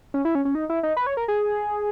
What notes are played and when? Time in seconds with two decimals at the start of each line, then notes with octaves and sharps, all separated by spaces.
0.14 C#4
0.25 E4
0.35 C#4
0.45 C#4
0.55 D#4
0.70 E4
0.83 D#4
0.97 B4
1.07 C#5
1.17 A#4
1.28 G#4